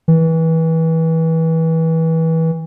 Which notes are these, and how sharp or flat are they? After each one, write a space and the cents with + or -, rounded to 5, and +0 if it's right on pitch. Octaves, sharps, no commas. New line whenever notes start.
E3 -25